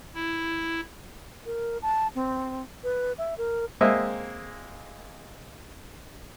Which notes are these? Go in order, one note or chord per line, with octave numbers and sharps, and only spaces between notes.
E4
A#4
A5
C4
B4
E5
A#4
G#3 A#3 C4 D#5 E5